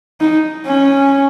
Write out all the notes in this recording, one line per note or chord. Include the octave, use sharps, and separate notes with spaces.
D#4
C#4